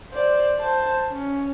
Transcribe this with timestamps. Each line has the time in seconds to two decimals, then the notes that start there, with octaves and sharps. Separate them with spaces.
0.11 C5 D5
0.59 C5 A5
1.11 C#4